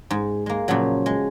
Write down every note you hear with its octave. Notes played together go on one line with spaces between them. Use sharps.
G#2
G#3 A#3
A#2 C#3 F3 F#3
G#3